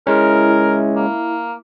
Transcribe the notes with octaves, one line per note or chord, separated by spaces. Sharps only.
G#3 C#4 E4 A#4
A#3